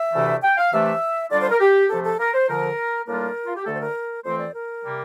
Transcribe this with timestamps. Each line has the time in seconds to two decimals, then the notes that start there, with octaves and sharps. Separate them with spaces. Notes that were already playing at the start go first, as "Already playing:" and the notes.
Already playing: E5
0.13 D2 C3 E3 A3 E4
0.43 G5
0.58 F5
0.72 C3 E3 A3 D4 E5
1.31 D3 G3 D4 F4 D5
1.41 C5
1.51 A#4
1.60 G4
1.90 C3 F3 A3 A4
2.04 A4
2.19 A#4
2.34 C5
2.48 F2 D3 F3 A#4
3.07 A2 G3 A#3 D4 F4 A#4
3.46 F4
3.56 G4
3.66 D2 D3 A3 A4
3.75 C5
3.81 A#4
4.25 F2 E3 A3 C4 C5
4.40 D5
4.55 A#4
4.84 C3 G3 A#3